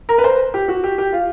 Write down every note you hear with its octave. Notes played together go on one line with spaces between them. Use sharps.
A#4
B4
C5
G4
F#4
G4
G4
F4